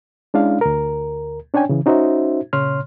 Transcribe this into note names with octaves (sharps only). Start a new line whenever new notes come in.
G#3 C#4 D4 E4 F5
D2 A#4
C#4 D4 C#5 G5 G#5
C#3 E3
C#4 D#4 F#4 C5 E5
A#2 C#3 C#5 C6 F6